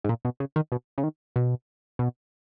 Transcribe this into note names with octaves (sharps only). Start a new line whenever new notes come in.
G#2
A#2
B2
C#3
D#3
B2
C#3
D#3
B2
B2